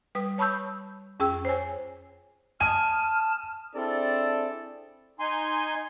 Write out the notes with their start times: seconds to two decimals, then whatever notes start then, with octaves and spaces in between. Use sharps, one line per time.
0.15 G3 B4 D#6
0.38 C#5 A5 B5 C#6 E6 G6
1.20 F2 C#4 G#4 G5 E6
1.45 C5 C#5 G#5
2.60 G#5 A5 D#6 F6 D#7
3.75 C4 D4 E4 G#4 A4 D5
5.20 D#4 G#5 C6